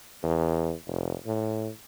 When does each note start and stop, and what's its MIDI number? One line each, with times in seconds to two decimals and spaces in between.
0.23 0.73 40
0.87 1.14 29
1.26 1.69 45